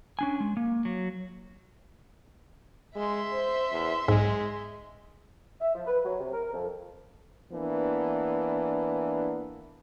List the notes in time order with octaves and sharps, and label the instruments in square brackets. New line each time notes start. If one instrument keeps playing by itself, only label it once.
[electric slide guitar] C#4 D4 G#5
G#3
A#3
F#3
[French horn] G#3 [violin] E5 C6
[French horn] C5
E2
[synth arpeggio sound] B1 G#2 [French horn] G#3
[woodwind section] E5
F3
B4
F#3
C3
A#4
F2
[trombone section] E3 A#3 B3 D4